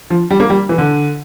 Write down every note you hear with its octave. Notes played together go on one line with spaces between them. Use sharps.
F3
G3
A#3
G3
E3
D3